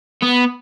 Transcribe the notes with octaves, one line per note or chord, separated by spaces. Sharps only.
B3